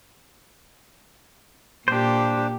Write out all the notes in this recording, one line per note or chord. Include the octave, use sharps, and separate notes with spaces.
A#2 D4 G4 C5